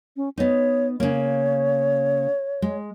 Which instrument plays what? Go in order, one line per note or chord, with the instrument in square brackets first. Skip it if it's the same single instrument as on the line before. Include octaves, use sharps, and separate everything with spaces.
[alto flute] C#4
[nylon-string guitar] B3 D#4 [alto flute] C#5
[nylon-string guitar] C#3 A#3 [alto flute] C#5
[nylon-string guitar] G#3